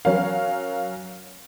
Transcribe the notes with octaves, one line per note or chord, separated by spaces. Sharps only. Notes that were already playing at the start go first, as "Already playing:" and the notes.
F#3 C#4 A#4 F5